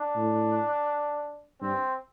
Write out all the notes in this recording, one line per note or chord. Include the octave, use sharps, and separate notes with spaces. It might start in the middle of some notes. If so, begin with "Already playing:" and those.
Already playing: D4
A2
G2 C4